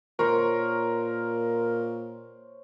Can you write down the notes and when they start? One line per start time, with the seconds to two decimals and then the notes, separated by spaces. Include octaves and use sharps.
0.19 A#2 A#4 C5 C#5